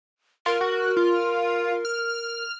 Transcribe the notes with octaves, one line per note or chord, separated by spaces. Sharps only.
F4 A#4
F#4
F4
F6